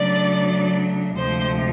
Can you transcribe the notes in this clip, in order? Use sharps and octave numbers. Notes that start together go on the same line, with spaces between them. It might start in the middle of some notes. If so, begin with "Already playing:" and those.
Already playing: C#3 F#3 A3 D4 D5
D2 C3 F3 G#3 C5